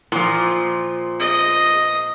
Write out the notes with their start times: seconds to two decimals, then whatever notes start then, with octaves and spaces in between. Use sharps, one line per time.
0.12 A#2 F3
1.20 D#5